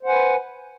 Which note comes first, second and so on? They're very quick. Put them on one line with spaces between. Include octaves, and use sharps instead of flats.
C5 F#5 G#5 B4